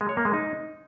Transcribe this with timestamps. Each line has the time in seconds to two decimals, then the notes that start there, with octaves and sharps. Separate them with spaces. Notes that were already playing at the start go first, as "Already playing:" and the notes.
0.01 G#3
0.09 C#5
0.17 A#3
0.25 G#3
0.33 D#4